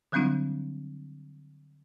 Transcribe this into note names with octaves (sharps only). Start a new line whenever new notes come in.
D3 F#3 G3 C4 D4 E4